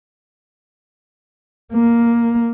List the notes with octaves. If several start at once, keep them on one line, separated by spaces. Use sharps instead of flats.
A#3